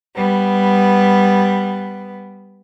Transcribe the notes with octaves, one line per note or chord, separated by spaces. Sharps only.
G3 B3